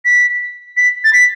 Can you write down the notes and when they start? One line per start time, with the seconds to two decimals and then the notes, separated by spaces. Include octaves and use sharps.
0.05 B6
0.77 B6
1.04 A6
1.13 B6